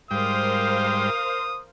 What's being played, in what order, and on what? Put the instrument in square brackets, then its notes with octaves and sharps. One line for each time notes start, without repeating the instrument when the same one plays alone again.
[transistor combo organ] G#2 G3 G5 [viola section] A#4 C5 F5 [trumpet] D#6